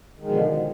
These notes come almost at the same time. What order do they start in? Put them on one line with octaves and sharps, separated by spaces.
D#3 G#3 B2 F3 D3